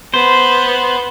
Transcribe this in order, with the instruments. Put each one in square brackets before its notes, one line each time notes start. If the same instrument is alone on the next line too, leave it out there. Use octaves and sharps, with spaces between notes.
[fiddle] B3 [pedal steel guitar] C5